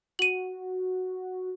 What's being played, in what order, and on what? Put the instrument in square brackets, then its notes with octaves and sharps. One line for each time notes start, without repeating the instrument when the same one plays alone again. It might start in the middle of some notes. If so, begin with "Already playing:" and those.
[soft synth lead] F#4 [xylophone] D#7 F#7